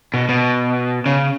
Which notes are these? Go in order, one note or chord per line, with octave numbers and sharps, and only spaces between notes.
B2
B2
C#3